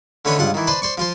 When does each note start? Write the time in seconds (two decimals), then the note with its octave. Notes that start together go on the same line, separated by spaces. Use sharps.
0.25 D3 A3 C#4 B4 C#5 D#5
0.38 C#2 G2 F4 F#5
0.54 D#3 E3
0.67 B4 C5 D5 A5
0.82 C5 D5 C#6
0.98 F3 F4 C5